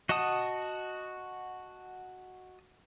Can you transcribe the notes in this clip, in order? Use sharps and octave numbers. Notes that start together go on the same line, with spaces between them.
F#4 D#5 F#5 A5 D#6